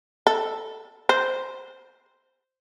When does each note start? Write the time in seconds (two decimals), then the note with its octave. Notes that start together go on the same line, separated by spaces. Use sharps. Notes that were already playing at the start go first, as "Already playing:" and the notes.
0.27 A4
1.09 C5